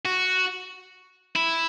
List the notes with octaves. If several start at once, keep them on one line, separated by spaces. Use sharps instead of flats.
F#4
E4